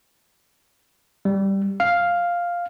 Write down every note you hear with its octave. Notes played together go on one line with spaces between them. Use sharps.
G3
F5